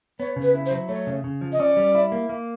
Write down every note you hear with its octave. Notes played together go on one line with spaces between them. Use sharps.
B3 C#5
C#3
B4
E4
C5
F#3
A3 C#5
C#3
C#3
F3
D#5
C#4 D5
G3
E4
A#3
A#3